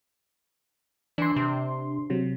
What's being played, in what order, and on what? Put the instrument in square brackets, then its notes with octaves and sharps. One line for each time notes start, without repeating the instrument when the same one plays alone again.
[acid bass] E3 [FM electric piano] D4 C6
[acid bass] C3
[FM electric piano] C3 F#3